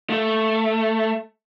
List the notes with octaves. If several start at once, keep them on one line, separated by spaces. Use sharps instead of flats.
A3